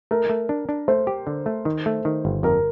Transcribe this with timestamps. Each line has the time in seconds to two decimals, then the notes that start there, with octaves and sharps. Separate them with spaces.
0.11 A3 A#4
0.29 A3
0.49 D4
0.69 D4
0.88 A3 C5
1.07 G4
1.27 D3
1.46 A3
1.65 D#3
1.86 A3
2.05 D#3
2.25 G1
2.43 F2 A#4